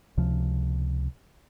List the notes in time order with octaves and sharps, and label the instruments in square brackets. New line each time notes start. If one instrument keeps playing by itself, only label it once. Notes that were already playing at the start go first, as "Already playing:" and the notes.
[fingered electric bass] C#2 C3 F3